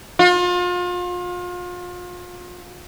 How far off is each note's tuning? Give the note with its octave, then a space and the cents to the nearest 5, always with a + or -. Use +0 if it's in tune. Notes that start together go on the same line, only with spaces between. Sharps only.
F4 +35